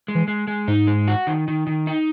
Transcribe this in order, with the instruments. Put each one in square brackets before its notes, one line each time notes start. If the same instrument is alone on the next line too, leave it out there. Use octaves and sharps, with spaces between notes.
[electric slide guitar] G#3
[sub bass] E3
[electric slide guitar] G#3
G#3
[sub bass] G#2 [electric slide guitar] D#4
[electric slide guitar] G#3
F#4
D#3
D#3
D#3
D#4